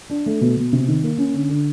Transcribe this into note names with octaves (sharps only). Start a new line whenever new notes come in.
D4
A3
B2
B2
C3
D#3
A#3
C#4
D3
D3